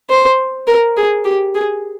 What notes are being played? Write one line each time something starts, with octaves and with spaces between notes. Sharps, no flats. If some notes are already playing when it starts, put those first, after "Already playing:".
C5
A#4
G#4
G4
G#4